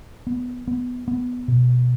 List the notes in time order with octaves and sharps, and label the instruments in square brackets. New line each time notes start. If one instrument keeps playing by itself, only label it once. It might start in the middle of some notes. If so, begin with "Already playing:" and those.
[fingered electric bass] B3
B3
B3
B2